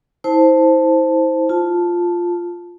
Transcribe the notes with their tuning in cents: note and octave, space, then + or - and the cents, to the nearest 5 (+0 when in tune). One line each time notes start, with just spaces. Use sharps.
E4 -40 C5 +0 A5 +0
F4 +0 A5 +0